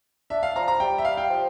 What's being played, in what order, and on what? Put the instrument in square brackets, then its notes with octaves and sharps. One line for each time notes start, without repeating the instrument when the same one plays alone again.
[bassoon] D4 [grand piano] E5
[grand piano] F5
[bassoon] F3 [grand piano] A#5
[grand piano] A#5
[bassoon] G3 [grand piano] G5
[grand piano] E5
F5
G5
[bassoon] F3